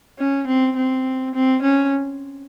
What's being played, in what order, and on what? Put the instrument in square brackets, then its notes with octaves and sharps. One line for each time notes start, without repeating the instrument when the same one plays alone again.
[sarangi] C#4
C4
C4
C4
C#4